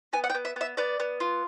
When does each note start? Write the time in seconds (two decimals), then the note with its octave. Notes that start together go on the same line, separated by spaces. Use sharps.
0.13 B3 G#5
0.24 F#5
0.30 G5
0.35 B3
0.45 E5
0.56 B3 E5
0.77 B3 D5
1.00 B3
1.20 F4